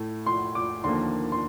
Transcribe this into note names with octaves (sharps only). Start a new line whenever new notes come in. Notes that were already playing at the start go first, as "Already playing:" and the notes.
Already playing: A2 A3
C6
D6
D#2 D3 F3 A#3 C6
C6